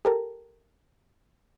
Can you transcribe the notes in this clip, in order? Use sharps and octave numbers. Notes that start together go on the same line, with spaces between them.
G4 A4 A#4